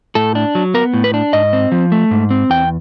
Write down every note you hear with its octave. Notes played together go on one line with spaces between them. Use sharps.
A2 A4
D4
F#3
B3 A#4
A2
B4
D4
G#2 D#5
C4
F3
A3
G#2
C4
E2 G5